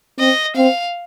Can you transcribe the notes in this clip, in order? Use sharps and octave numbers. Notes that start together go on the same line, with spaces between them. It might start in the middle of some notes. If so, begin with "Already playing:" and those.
C4 D#5
C4 F5